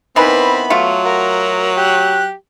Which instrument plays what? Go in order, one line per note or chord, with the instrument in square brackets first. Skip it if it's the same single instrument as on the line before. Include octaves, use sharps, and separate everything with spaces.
[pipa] D#3 E3 B4 [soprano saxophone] B3 [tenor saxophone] C4 [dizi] B5
[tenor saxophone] F#3 [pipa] A3 F4
[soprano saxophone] F#4 [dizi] A#4
[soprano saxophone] G4 [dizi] F#6